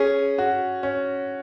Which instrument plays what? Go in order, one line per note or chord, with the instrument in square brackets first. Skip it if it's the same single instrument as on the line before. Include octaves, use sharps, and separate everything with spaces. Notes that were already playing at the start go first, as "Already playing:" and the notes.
Already playing: [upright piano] C#4 [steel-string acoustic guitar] G#4
[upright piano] F#4
C#4